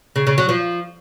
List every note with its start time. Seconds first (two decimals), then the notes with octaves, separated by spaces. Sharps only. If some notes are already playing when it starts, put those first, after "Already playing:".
0.16 C#3
0.27 C#3
0.38 F#3
0.49 F3